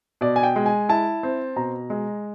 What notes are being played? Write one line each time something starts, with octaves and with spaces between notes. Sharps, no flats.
B2 D5
G#5
G5
G#3
G#5
E4 A5
C4
B2 A#5
G#3